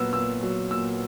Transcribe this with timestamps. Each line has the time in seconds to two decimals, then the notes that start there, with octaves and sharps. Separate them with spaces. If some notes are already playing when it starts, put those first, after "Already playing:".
Already playing: A#2 F#3 B3 E6
0.13 A#2 E6
0.43 F#3
0.71 A#2 E6